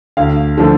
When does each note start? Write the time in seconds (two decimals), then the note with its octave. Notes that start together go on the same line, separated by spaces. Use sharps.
0.17 D2 F5
0.58 D3 F3 A3